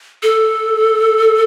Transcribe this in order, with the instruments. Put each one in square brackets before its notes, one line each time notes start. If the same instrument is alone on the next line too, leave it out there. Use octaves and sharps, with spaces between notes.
[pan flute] A4